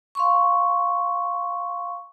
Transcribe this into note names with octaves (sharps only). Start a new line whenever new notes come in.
F5 C6 C#6